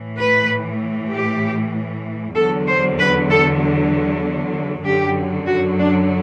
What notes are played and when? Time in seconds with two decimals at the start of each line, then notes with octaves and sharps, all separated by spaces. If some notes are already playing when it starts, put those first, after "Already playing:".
Already playing: A2 E3
0.19 B4
1.11 G4
2.36 E2 D3 F#3 A4
2.67 C5
2.98 B4
3.29 A4
4.84 F#2 D3 F#3 G4
5.47 F#4
5.78 D4